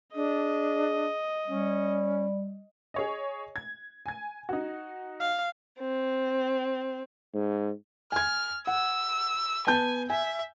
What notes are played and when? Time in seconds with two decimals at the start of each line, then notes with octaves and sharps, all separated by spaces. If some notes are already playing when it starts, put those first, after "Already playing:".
0.15 D4 G#4 D#5
1.47 G3 C#4
2.94 G#4 C#5 D#5
3.56 G#6
4.06 G#5 G#6
4.49 D#4 F#4
5.20 F5
5.78 C4
7.34 G#2
8.12 G#5 F6 G#6
8.67 F#5 E6
9.67 B3 G#5 A5 G6
10.10 E5 G#5